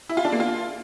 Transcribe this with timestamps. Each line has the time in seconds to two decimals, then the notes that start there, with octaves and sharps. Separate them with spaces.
0.09 E4
0.17 F4
0.25 D4
0.32 A#3
0.40 F4